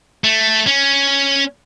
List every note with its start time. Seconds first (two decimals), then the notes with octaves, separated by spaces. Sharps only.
0.24 A3
0.67 C#4